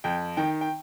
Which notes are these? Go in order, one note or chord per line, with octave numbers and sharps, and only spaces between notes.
F2 G5
D#3 G5
G5